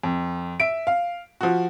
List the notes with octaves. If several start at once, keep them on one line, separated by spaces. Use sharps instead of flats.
F2
E5 D7
F5
F3 F#4